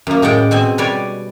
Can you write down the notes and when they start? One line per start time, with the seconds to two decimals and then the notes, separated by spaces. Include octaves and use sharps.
0.07 F#2 A#3
0.22 A2 G#3 D5 F#5 G5
0.51 B2 C4 G#5
0.78 G3 B4 C#5 D5 G#5